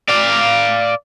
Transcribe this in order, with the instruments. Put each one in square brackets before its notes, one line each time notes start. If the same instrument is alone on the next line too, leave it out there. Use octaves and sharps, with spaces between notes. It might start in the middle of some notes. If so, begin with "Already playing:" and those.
[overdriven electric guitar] D5 F5